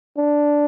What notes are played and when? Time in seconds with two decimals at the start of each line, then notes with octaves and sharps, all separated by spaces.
0.18 D4